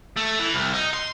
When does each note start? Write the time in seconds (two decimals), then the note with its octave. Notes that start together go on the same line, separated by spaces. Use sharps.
0.17 A3
0.40 E3
0.54 C2
0.74 D#4
0.94 C6